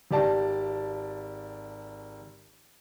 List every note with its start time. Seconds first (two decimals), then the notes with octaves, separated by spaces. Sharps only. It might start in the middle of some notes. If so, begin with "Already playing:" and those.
0.11 G#1 G4 D5 A5